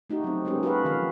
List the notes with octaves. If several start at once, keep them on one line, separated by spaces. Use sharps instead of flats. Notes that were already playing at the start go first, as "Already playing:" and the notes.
A3 D#4 F#4 G4
F#3 C4
G#3 A#3 B3 C#4 G4
F#4 G4 A4 B4 F5
D#3 F3 F5